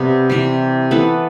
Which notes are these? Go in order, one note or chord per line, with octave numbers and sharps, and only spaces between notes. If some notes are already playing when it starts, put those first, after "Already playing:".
Already playing: C3 G3 B3 G4
C3 E3 G3
E3 B3 A4